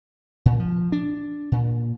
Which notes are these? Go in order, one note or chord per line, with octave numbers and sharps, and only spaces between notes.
A#2
F3
D4
A#2